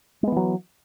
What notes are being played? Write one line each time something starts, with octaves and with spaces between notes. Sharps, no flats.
E3 F#3 G#3 B3